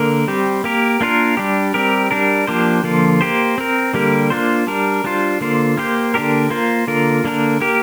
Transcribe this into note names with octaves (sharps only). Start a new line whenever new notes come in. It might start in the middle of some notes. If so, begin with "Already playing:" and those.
Already playing: D3 A#3 A#4
G3 C4 G4
A#3 G4 A#4
A#3 D4 F4 A#4
G3 D4 G4
G3 C4 G4 A#4
G3 D4 A#4
F3 A#3 D4 G4 C5
D3 F3 A#3 F4
A#3 G4 C5
C4 A#4
D3 G3 A#3 G4 A#4
A#3 D4 F4 C5
G3 D4 A#4
G3 D4 F4 C5
D3 A#3 F4 C5
A#3 G4 C5
D3 A#3 D4 G4 A#4
A#3 F4 C5
D3 A#3 F4 A#4
D3 A#3 D4 A#4
A#3 G4 A#4